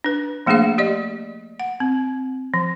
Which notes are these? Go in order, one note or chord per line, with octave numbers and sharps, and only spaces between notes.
D4 B4
F3 A3 A#3 D4 G#4 F5
G4 D5 D#5
F#5
C4
F3